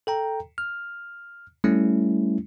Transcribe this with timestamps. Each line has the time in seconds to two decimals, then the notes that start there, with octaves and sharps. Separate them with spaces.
0.07 A4 G5 A#5
0.58 F6
1.64 G3 A3 C#4 E4